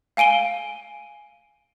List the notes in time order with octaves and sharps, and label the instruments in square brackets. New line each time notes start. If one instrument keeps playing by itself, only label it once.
[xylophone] F5 G#5 D7 D#7 G7